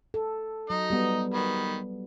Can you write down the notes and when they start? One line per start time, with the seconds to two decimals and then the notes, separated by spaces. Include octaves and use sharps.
0.14 A4
0.70 F#3 D#4 D#5
0.90 G3 B3
1.34 D#3 B5